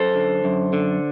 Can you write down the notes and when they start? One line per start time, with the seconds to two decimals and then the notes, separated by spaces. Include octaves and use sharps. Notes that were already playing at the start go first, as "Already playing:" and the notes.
Already playing: F#2 A4 C5
0.14 D3
0.44 F#2
0.73 D3